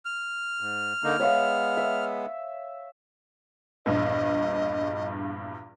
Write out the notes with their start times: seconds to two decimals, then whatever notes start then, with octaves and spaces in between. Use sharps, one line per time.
0.05 F6
0.60 G#2
1.04 D3 A#3 D#4
1.19 G#3 B3 C#5 E5 F5
1.77 E5
3.86 A#1 E2 G2 D#5